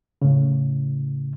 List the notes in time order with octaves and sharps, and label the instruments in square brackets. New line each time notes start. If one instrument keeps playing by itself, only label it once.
[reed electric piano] A2 C#3